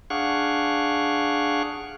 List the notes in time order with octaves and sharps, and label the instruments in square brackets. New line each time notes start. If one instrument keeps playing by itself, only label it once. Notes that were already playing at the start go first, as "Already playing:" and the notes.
[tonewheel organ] D4 G#4 F5 F#5 C#6